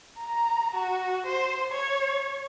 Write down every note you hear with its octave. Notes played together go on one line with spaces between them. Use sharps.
A#5
F#4
C5
C#5